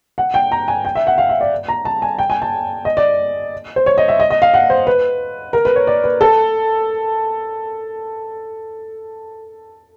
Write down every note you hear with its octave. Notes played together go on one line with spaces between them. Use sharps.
F#5
G5
A#5
G#5
G5
E5
F#5
F5
E5
D5
A#5
A5
G#5
G5
G#5
A5
D#5
D5
C5
C#5
D#5
E5
D#5
D#5
F5
F#5
C5
B4
A#4
B4
C#5
D5
B4
A4